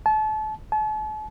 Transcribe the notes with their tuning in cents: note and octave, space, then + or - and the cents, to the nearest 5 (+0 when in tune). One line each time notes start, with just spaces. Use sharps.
A5 -30
A5 -40